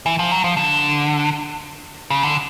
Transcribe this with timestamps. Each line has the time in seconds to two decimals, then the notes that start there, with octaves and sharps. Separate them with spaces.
0.06 E3
0.19 F3
0.32 F#3
0.44 F3
0.57 D3
2.10 C#3
2.23 D3